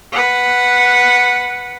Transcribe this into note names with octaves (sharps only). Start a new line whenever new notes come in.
B4 F#5